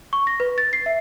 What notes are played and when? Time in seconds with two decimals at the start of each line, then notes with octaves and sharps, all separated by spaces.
0.13 C#6
0.27 A#6
0.40 B4
0.58 A6
0.73 C7
0.86 E5